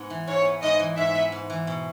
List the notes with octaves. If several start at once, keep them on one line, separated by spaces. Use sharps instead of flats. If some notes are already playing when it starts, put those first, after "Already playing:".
Already playing: G#2 B3
E3
G#2 C#5
B3
G#2 D#5
E3
G#2 E5
B3
G#2
E3
B2